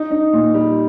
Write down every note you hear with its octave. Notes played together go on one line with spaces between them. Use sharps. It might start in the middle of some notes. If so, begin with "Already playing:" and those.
Already playing: D#4
D#4
A#2
G3